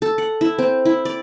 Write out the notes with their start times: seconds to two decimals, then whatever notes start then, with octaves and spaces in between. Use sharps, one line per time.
0.02 A4
0.18 F#5
0.41 E4
0.59 C4
0.85 E4
1.05 D5